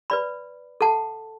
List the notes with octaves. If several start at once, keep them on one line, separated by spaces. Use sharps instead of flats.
B4 D5 B5
A4 F#5 A5